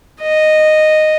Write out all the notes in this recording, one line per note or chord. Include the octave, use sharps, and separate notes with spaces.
D#5